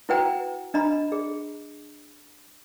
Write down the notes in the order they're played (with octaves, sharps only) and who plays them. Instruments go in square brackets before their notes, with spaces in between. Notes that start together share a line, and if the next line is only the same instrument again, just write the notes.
[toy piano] E4 F#4 B4 F#5 G5 A#5
D4 D#5 A#5 B5
G#4